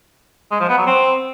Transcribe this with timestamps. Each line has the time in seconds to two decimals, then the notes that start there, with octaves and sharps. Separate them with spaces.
0.51 G#3
0.60 F3
0.69 B3
0.78 F#3
0.87 C4